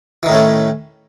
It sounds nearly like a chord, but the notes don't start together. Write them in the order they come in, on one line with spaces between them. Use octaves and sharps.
E3 D#3 A2 C#4 A3